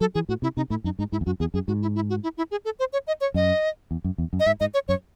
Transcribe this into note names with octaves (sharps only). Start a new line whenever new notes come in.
F#3 A4
E3 G#4
A2 F#4
C3 E4
C3 D#4
A2 E4
F#2 D#4
G#2 D#4
G#2 E4
E2
F#2 F#4
E2 G#4
F#2 G#4
G#2 F#4
E4
E4
F#4
E4
E4
G#4
A4
C5
C#5
D#5
C#5
F#2 D#5
E2
F#2
E2
F#2
D#5
G#2 E5
G#2 D#5
C#5
F#2 C#5